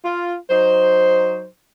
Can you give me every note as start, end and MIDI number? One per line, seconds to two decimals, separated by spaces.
0.04 0.35 65
0.50 1.45 54
0.50 1.45 63
0.50 1.45 72